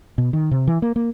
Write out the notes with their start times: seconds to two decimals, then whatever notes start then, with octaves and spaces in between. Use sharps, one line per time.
0.18 B2
0.33 D#3
0.51 C3
0.67 E3
0.82 A#3
0.96 A#3